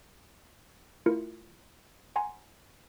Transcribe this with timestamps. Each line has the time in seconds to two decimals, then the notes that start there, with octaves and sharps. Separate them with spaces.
1.06 A3 E4 F4 A#4 C#7
2.16 F#5 G#5 A#5 C6